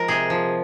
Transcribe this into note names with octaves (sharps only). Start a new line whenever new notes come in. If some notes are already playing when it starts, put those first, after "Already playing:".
Already playing: F3 G#3 A#4
C3 G#4
F3